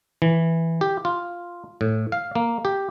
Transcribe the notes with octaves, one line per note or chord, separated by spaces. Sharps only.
E3
G4
F4
A2
F5
A#3
G4